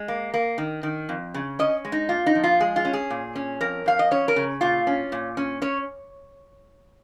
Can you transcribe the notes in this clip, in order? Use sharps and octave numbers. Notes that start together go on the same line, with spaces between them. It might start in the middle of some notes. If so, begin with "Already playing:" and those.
Already playing: G#3
A#3
A#3
D#3
D#3
F2
C#3
C#4 D#5
G#3
D#4
A#2 F4
D#4
F3
F4
G#3 G#4
F4
C#4
G#4
A#2
C#4
F2 A#4
F2 F5
D#5
C#4 C#5
A#4
C#3
A#2 F4
C#4
A#2
C#4
C#4 C#5